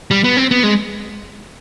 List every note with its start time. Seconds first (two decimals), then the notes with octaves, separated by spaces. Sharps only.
0.11 G3
0.24 B3
0.37 C4
0.51 B3
0.63 G#3